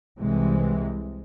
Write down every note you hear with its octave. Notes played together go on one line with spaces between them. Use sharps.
C2 C3 E3 G#3